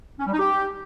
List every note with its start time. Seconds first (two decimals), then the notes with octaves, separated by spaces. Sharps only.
0.19 C#4
0.26 G3
0.32 D#4
0.39 G4